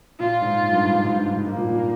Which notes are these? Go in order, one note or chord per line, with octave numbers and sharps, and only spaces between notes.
A#2 F4
G#2
G#2
G2
G#2
G2
G#2
G2
G#2
G#2
G#2 A#3
A#2
A#2